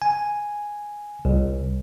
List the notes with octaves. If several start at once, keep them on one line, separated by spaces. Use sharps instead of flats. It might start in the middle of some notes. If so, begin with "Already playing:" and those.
G#5
C2